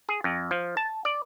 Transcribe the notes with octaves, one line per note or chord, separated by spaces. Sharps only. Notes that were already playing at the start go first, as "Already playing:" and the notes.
G#4
F2
F3
A5
D5